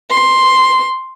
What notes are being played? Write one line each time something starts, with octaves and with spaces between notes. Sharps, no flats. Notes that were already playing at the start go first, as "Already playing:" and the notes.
C6